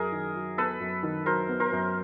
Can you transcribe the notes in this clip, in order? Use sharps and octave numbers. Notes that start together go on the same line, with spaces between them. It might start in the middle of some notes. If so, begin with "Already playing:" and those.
Already playing: F#2 G#4 A#4
D#3
F#3
B3 A4 B4
F#2
D#3
F#3 A#4 C5
B3
A#4 C5
F#2